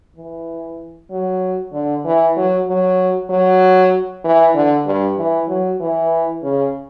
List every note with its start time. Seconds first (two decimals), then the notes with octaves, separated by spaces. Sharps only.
0.16 E3
1.11 F#3
1.73 D3
2.05 E3
2.36 F#3
2.68 F#3
3.30 F#3
4.24 E3
4.55 D3
4.86 G2
5.17 E3
5.48 F#3
5.80 E3
6.43 C#3